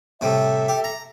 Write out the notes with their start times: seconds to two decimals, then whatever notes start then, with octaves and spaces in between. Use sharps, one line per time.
0.21 A2 C3 G3 A4 E5
0.68 G4
0.84 A#5